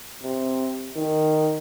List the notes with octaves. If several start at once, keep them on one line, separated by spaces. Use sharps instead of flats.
C3
D#3